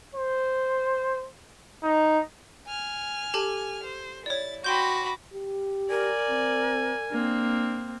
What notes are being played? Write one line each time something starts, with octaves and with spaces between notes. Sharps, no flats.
C5
D#4
G#5 F6
G4 A4 A5
C5
E4 C#5 D5 A6
F#4 G5 B5 C6 D6 G6 A#6
G4
A#4 D5 G#5
C4
A#3 C4 D4